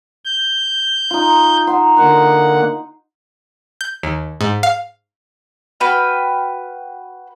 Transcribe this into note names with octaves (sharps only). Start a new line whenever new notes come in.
G6
D#4 F4
D#4 F#5 C6
D3 A#3 D#5 F#5
G6
D#2
G#2
F5
F#4 B4 G5 F6